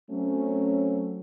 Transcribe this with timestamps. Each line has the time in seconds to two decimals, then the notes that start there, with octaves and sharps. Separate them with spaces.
0.10 F#3 A3 C4 C#4